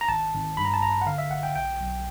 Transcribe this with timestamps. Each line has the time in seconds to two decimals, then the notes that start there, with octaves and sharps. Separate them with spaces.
0.01 A#5
0.09 G#1 A5
0.33 G#1
0.57 G2 B5
0.65 A#5
0.74 A5
0.82 A1 A#5
1.02 F#5
1.06 D3 F5
1.18 E5
1.30 G#1 F#5
1.43 G5
1.55 B1 G5
1.80 B1